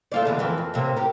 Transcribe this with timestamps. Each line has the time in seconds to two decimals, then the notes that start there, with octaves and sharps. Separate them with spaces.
0.12 A3 F4 D5
0.25 E2 D3 G#3
0.39 F2 E3 A#3
0.58 F2
0.74 A2 C3 A#3
0.96 G4 A#4